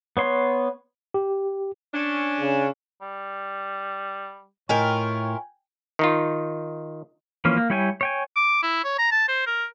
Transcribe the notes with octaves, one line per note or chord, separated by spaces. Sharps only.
B3 C#5 C6
G4
C#4 D4
C#3
G3
A2 E4 F4 A#4 C#5 D#5 G5 G#5
D#3 D#4 F4
E3 F3 A#3 C#4
A#3
G3 E4 C#5 G5 G#5
C#5 G5 G#5
D6
E4
C#5
A#5
A5
C5
A#4